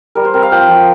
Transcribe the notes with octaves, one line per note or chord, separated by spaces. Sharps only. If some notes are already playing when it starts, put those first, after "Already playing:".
G3 A#4
C5
C4 A#4
F5
F3 G5
F3